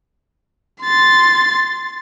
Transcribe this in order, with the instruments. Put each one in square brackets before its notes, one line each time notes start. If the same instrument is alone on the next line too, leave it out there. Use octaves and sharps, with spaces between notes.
[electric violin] C6 A6